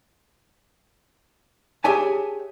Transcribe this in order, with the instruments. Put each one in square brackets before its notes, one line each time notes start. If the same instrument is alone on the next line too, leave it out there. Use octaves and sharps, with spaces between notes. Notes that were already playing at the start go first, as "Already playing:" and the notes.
[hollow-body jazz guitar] G4 G#4 C#5 E5 G#5 A5